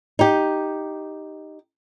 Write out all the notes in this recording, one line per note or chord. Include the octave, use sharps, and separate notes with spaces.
D#4 G4